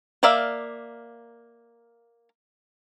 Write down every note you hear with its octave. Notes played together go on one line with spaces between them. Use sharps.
A#3 A#4 D5 E5 F5